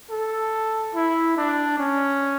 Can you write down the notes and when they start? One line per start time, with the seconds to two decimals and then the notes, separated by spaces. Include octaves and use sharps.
0.10 A4
0.95 E4
1.37 D4
1.78 C#4